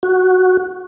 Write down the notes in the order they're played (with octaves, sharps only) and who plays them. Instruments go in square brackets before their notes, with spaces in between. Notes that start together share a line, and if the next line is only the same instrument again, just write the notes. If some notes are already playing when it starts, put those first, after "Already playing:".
[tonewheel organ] F#4